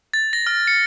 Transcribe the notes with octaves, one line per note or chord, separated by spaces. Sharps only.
A6
A#6
F6
C#7